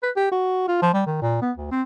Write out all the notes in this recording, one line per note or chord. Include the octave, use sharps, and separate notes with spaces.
B4
G4
F#4
F4
F3
G3
D#3
A#2
B3
D2
C4